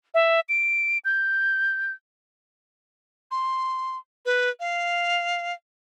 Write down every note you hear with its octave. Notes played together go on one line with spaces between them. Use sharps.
E5
D7
G6
C6
B4
F5